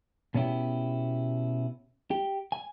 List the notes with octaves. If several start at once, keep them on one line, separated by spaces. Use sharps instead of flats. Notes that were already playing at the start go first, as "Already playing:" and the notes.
B2 B3 C#4 E4 G4
G4
G#5